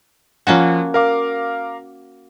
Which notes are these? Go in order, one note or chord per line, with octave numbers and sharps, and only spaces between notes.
F3 A#3 C#4 F#4 F#5
A#4 F5 D6